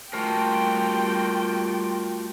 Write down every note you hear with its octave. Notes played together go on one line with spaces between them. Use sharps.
G3 A3 F4 F#4 A#4 G5